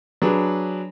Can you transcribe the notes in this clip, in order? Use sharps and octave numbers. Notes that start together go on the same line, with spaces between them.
F#3 D4 G#4 B4